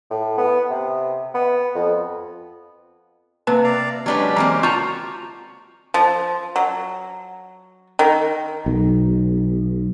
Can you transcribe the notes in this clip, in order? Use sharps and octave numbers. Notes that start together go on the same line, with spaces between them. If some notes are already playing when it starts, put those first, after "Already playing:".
A2
B3
C3
B3
F2
C3 A#3 B4 A5
D5 F5 A#5
F#3 G#3 C#4 D4 G4 B4
E3 A#3 C4 A#5
F4 F#4 A5 A#5 C#6 G6
F3
F#3
D#3
B1